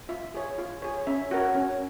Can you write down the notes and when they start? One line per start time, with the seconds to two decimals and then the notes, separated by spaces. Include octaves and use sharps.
0.09 F4 E5
0.34 G#4 C#5
0.58 F4
0.82 G#4 C#5
1.07 C#4 E5
1.31 F#4 A#4 C#5
1.55 C#4